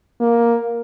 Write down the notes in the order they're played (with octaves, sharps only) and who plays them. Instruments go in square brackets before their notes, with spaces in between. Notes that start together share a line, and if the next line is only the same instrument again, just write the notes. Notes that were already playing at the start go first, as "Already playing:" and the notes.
[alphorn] A#3